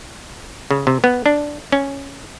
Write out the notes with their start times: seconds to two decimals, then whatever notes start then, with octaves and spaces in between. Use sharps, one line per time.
0.71 C#3
0.87 C3
1.04 B3
1.26 D4
1.72 C#4